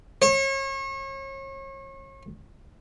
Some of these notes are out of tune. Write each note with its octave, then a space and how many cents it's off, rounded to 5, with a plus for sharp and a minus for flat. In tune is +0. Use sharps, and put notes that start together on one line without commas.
C#5 -35